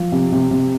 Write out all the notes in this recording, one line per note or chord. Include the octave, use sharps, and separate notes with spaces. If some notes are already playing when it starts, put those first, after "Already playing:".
Already playing: F3
C3
C3
C3